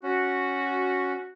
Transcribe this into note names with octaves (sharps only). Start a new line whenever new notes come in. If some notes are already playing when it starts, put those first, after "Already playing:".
C#4 F#4